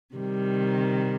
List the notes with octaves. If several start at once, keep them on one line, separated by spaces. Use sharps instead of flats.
C3 D#3 G3